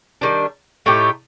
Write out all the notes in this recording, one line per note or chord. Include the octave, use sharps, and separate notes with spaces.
D#3 G3 D4
A2 A3 D#4 G4